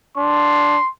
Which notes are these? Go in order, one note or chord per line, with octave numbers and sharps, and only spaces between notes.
D4 C6